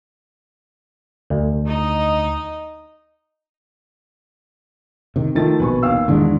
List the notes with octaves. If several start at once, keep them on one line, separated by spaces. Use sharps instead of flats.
D2
D#4 D#5
C3 D#3
D#3 F3 A3 A6
A#1 B2 B4 G#5 C#6
D#2 F5 E6
E1 G#2 D#3 E3 G#3 D4